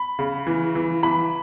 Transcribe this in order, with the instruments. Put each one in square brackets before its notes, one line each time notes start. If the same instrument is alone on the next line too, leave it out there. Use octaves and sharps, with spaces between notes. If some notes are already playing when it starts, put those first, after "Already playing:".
Already playing: [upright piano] B5
C#3
E3
E3
E3 B5